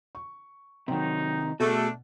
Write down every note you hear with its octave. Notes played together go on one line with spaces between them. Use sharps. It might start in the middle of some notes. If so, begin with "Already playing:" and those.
C#6
C3 D#3 F#3 D#4 G5
B2 A3 D4 F#4 G#4